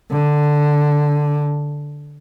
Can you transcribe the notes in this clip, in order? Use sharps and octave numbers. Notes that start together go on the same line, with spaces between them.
D3